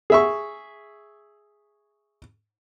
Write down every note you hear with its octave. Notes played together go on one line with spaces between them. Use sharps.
G#4 E5 C#6